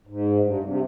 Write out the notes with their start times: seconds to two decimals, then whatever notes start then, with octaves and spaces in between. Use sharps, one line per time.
0.07 G#2
0.41 G2
0.64 C3